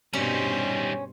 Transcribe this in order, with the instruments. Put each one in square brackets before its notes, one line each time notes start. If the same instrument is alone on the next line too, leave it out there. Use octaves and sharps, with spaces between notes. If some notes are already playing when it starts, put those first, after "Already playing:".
[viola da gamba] G2 B2 C5 [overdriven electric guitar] G3 D#4 [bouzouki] C#4